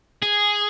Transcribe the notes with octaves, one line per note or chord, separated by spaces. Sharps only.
G#4